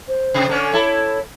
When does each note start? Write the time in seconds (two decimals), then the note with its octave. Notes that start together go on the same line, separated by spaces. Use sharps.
0.08 C5
0.34 C3
0.49 D3 C#4
0.74 E4 A4 C#5